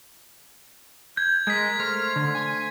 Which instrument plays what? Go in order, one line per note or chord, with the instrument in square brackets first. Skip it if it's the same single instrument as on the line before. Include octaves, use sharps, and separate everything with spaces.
[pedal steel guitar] G6 [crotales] G#6
[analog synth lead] G#3 [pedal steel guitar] A#4 [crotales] G#6 B6
[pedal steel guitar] A3 C5 [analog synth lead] F6
[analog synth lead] D3
G#5